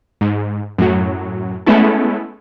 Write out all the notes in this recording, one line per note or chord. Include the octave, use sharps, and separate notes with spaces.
G#2
F#2 A2 F#3
G#3 A3 B3 C#4 E4 A4